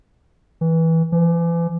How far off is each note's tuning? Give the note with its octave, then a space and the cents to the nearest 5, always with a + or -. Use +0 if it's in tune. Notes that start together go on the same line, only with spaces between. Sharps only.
E3 -15
E3 +40